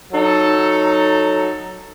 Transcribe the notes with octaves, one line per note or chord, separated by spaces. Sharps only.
F#3 D#4 A4